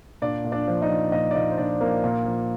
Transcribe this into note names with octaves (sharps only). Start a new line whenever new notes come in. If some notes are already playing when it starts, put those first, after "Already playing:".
A#2 D4 D5
A#2
D4 D5
F3
D#4 D#5
F3
A#2 D#4 D#5
D5
A#2 D#4 D#5
C5
A#2 D4 D5
F3 A#3 A#4
A#2
F3